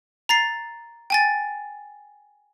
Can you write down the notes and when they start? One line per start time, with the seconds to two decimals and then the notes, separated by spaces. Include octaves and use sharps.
0.29 A#5 A6 C7
1.10 G5 G#5 A6